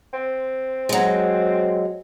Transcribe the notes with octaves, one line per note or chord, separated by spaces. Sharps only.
C4
F#3 G#3